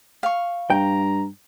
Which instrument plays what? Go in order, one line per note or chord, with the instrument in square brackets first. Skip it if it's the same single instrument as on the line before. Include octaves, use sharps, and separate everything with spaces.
[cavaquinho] F5 C#6
[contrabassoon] G2 [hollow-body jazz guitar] G5 [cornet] A#5